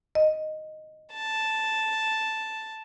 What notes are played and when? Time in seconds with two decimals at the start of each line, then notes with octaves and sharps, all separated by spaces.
0.15 D#5
1.13 A5